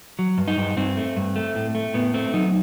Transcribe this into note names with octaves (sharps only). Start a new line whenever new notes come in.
F#3
G2
D#4
G2
G2 C4
A3
G2
A3
A2
A3
A2 B3
A3 C4
F#3 D#4